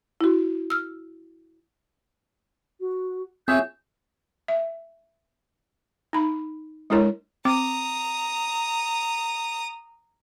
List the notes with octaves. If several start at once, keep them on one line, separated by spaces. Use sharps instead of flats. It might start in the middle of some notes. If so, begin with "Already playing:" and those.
E4 F#4
E6 F6
F#4
C4 F4 G#4 C#5 E5 G6
E5
D#4 B5
G#3 D4 E4 A#4 C#5
C4 A#5 D6 D#6